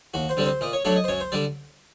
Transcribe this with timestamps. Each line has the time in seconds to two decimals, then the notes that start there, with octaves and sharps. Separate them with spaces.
0.14 D#2 F#4
0.29 C5
0.37 D3 G3 C4
0.46 C5
0.61 A#2 D#5
0.73 C#5
0.85 F#3 A3 D4 C#5
0.96 D#5
1.04 C5
1.08 F#2 C#5
1.20 C5
1.32 D3 G3 D5